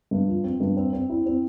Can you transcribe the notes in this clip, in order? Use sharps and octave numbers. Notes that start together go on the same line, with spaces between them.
G2
F3
C4
G2
C4
C4
E4
C4